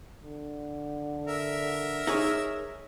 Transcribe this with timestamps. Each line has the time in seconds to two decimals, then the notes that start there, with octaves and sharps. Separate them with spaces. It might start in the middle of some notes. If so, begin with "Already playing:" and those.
0.24 D3
1.27 A#4 E5
2.07 D#4 G#4 C#5